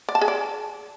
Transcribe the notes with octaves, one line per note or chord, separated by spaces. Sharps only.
D5
A5
G#4
D5